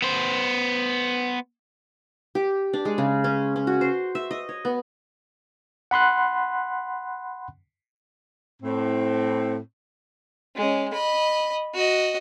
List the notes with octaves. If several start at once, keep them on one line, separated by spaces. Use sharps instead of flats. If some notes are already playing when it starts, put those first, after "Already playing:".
B3 C5
G4
D4
G#3
C#3
C#4
C#4
F#4
C5
E5
D#5
C#5
B3
F#5 B5 C6 F#6
A2 C4
G#3 C#4
D#5 B5
F#4 D#5